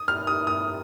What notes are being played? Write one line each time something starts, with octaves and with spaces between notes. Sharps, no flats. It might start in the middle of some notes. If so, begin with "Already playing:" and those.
Already playing: D#6
F6
D#6
D#6